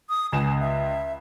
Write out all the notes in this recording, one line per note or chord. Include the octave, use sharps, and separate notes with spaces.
D#6
C#2 G#5 E7
E5